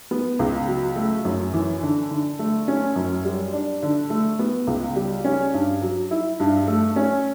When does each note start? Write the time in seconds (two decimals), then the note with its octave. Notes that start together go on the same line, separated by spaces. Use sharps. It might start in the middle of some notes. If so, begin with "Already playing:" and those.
0.11 B3
0.39 C#2
0.67 F#3
0.96 A3
1.25 F#2
1.53 E3
1.83 D3
2.11 D3
2.39 A3
2.68 C#4
2.96 F#2
3.25 G3
3.53 D4
3.83 D3
4.10 A3
4.39 B3
4.67 C#2
4.96 G3
5.25 C#4
5.54 G2
5.82 F#3
6.11 E4
6.40 G2
6.67 A3
6.96 C#4